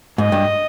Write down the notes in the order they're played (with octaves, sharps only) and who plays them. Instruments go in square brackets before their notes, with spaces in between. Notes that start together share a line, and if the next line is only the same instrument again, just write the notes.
[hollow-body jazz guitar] G#2 [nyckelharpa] D#5
[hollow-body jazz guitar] G2